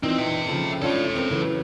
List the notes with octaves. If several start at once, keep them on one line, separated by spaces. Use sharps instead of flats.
A#2 E3 C4 D#4
E5 G5
C#3 F3 A4
C#4 D4 F4 A4 C#5
C4 A#4
C#3 E3 F#3